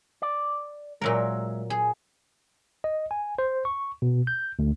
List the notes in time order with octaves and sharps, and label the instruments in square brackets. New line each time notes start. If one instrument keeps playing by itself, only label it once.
[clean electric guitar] D5
[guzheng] A#2 F#3 A#4 [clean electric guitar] G#3 E5
[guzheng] G#4
[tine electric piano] D#5
G#5
C5
C#6
B2
G6
D2